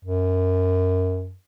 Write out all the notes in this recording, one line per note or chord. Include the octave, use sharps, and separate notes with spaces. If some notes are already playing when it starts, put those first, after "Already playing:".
F#2